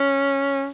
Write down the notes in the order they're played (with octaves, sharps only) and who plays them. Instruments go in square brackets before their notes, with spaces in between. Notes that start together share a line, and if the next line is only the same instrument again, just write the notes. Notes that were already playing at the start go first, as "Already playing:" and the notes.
Already playing: [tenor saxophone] C#4